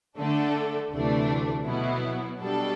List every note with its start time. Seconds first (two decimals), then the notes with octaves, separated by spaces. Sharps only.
0.18 D3 A3 D4 A4
0.92 D2 C3 E3 A3 D4
1.65 B2 F#3 B3 E4
2.39 B2 G3 D4 A4